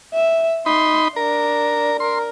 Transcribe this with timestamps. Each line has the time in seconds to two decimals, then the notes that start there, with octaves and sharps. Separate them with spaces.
0.13 E5
0.66 D#4 B5 C6
1.16 D4 A#4
2.00 A#4 C6